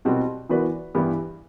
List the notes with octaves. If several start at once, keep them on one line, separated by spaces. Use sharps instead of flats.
B2 G3 C4 F#4
E3 B3 F#4 B4 D5
G2 E3 B3 E4 G4